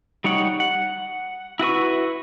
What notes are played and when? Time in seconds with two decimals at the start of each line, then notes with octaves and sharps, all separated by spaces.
0.24 G3 D#4 C#5 F#5
0.60 F#5
1.59 E4 F#4 B4 C#6